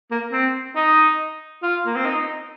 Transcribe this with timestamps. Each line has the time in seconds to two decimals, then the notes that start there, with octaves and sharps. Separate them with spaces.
0.11 A#3
0.32 C4
0.76 D#4
1.63 F4
1.86 A#3
1.96 C4
2.06 D#4